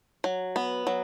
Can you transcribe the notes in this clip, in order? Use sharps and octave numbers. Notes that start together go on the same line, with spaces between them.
F#3
B3
F#3